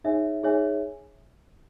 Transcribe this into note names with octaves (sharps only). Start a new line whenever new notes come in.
D#4 G#4 C#5 E5 G#5
D#4 G#4 C#5 E5 G#5